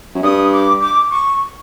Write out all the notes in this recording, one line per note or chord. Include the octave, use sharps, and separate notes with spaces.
F#2
G2 D#6
D6
D6
C#6